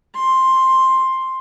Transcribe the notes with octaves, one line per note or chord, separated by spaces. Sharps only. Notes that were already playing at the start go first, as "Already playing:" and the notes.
C6